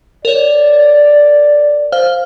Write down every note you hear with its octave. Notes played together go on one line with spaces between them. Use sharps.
A#4 C#5 D5
C5 F5 F6